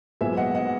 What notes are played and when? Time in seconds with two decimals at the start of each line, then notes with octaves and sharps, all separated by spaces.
0.21 B1 A#2 G#3 B3 E5 G#5
0.37 D#5 F#5
0.55 D#5 F#5